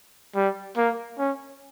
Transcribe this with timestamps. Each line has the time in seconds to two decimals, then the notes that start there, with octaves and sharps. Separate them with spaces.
0.36 G3
0.77 A#3
1.19 C#4